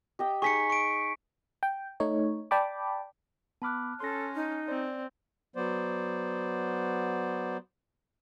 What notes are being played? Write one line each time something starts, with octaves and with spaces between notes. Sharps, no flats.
G4 D#5 G5
D#4 G#4 C#6 B6 C#7
C#6 D7
G5
A3 D#4 C#5
D5 G5 A5 B5 D6
B3 A5 B5 D6 F6 F#6
C#4 A4 C6 A#6
D#4
C4 D5
F#3 B3 C5 D5